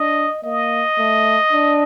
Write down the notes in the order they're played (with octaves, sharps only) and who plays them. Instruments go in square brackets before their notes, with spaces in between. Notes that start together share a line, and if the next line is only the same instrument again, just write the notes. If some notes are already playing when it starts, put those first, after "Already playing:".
Already playing: [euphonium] D4 [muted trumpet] D#5
[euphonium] A#3 [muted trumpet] D#5
[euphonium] A3
D4